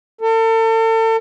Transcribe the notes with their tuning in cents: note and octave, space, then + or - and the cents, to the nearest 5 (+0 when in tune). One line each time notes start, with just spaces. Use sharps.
A4 +40